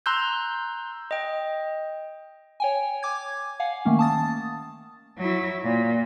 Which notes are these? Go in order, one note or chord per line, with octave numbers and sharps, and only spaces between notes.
A#5 C6 E6 F#6 G6
D#5 G5
C#5 G5 G#5
G#5 D6 G#6
F5 F#5 G#5
D#3 A3 A#3 C#4
A5 D#6 A6
F#3 E4
A#2